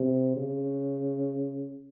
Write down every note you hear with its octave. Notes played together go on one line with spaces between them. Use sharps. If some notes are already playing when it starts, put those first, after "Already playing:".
Already playing: C3
C#3